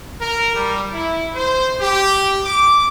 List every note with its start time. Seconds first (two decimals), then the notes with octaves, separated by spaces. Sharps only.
0.21 A#4
0.55 G3
0.93 E4
1.35 C5
1.79 G4
2.43 D6